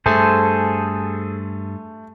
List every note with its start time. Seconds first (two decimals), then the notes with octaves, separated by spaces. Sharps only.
0.06 G2 A3 G#4 A4 C5